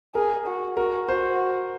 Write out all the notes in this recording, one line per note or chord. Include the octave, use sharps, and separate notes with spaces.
G#4 A#4
F#4
F#4 A#4
F#4 C5